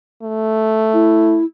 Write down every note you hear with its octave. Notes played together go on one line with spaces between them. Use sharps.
A3
E4